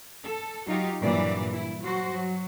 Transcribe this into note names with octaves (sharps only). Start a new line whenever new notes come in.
A4
F#3 D#4 F4 G4
G2 A#2 E3 F#3 D5
E4
F#3 F#4 C5
F#3